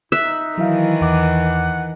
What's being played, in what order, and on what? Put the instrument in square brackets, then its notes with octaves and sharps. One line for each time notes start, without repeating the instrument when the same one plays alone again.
[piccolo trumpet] D#4 [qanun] E5 [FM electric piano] F#6
[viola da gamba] D#3 E3 [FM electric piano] F#3 E4 F5
[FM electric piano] E2 D6 [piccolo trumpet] F#5